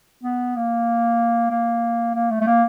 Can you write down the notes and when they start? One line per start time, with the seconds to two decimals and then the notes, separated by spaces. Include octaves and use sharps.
0.23 B3
0.56 A#3
1.51 A#3
2.15 A#3
2.30 A3
2.41 A3
2.47 A#3